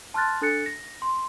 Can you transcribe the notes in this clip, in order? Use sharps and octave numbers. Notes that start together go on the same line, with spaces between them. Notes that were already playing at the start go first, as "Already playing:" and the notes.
A5 C6 F6 F#6 A6
D4 A4 F#6 A6 C#7
A#6
C6